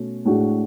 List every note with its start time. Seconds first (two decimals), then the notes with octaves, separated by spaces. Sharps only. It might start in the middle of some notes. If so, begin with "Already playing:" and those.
Already playing: B2 A3 C#4
0.25 A2 G#3 D4 F#4